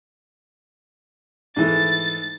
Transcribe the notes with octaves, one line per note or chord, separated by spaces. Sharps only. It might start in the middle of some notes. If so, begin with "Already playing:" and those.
G#2 E3 A3 A6